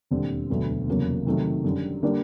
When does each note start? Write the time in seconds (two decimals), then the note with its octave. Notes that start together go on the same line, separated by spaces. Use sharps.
0.11 E1 D#2 D3 G3 C4
0.50 E1 D2 D3 F#3 B3
0.87 F1 E2 C#3 F#3 A#3
1.26 C3 D#3 F#3 A3
1.64 F#2 D3 G3
2.03 D3 G3 A#3 D4